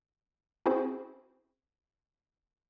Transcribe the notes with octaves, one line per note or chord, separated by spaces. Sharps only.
C4 C#4 E4 F#4 G#4 C5